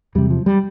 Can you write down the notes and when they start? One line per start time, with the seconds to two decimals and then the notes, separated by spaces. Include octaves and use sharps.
0.15 E2 C3 G3
0.30 F3
0.46 G3